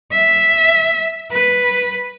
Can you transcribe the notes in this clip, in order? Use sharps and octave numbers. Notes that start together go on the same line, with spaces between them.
E5
B4